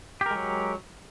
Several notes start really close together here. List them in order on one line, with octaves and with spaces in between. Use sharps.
G4 A#4 G#3 F#3